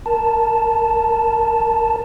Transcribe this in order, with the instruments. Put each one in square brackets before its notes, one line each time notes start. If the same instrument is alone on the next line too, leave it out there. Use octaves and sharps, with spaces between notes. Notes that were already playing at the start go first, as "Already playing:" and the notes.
[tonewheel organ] A#4 A5